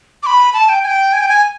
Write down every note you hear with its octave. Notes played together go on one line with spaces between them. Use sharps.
D6
B5
A5
G5
G#5
G5
G#5
G5
G#5